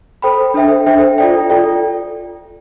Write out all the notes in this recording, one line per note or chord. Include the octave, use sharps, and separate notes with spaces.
A4 C5 G5 B5
D4 A4 C5 E5 G5
D4 A4 C5 E5 G5
F4 A4 D5 G5
F4 A4 D5 G5